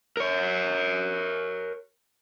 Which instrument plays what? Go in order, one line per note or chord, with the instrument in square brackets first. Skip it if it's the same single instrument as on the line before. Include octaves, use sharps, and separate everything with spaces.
[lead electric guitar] A#4 C#5